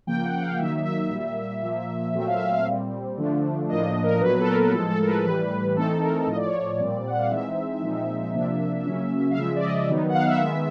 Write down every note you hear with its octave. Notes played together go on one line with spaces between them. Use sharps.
C#3 F3 A#3 G5
F#5
F#5
F5
D#3 F#3 A#3 D#4 E5
E5
A#2 G3 A#3
A#2 F3 A#3
A#2 F#3 A3 C4 E5
F5
E5
F5
F5
A#2 G3 C4
D3 F3 A3 D4
A2 F3 A#3 D4 D#5
A#4
A#2 F#3 B3 B4
A4
A#4
A2 F3 G#3 A4
A4
A#4
B4
A2 E3 G3 B4
E3 A3 C4 D#4 A4
A#4
A2 F3 A3 D#5
D5
C#5
D5
A#2 G3 C4
F#5
F5
E3 G#3 C4 D#4 E5
A#2 F3 G#3 C4 D#4
C3 F3 A#3 D4
C#3 F#3 A#3 C#4
F5
C#3 F3 G#3 E5
D5
D#5
D#3 F#3 B3 D#4
F#5
F5
E5
D#3 G#3 B3